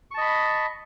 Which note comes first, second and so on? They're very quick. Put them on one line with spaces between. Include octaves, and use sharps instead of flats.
C#6 A5 D#5 B5